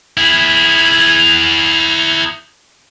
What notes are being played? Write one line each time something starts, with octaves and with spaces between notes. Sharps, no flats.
E4 G#4